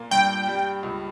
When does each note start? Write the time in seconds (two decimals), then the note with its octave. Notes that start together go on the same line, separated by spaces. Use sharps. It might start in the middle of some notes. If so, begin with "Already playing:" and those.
Already playing: A#2 A#3
0.11 G2 G5
0.48 G3
0.83 C#2